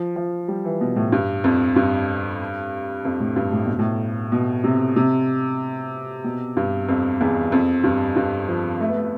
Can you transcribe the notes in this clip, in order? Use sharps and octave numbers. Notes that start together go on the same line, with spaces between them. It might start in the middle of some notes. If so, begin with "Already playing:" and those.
Already playing: F3
F3
G3
E3
B2
A2
G2
F2
G2
F2
A2
G2
A2
B2
A2
B2
C3
C3
B2
G2
F2
E2
F2
G2
G2
F3
A3
B3
A3